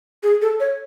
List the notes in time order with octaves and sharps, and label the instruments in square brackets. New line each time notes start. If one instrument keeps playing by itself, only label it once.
[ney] G#4
A4
C#5